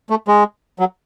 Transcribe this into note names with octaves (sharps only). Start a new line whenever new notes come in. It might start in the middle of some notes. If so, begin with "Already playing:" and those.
A3
G#3
F#3